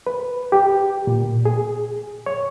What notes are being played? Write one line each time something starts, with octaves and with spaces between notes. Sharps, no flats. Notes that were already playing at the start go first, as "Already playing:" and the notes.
B4
G4
A#2
G#4
C#5